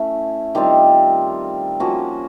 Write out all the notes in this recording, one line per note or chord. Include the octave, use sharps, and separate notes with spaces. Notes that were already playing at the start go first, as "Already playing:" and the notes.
Already playing: A3 C#4 E4
D#3 G3 C4 F4
F3 A#3 C#4 F#4